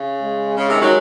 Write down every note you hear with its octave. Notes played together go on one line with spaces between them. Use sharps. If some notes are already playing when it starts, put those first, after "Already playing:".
Already playing: C#3
G#3
C#3
C3 D#3
D#3 F#3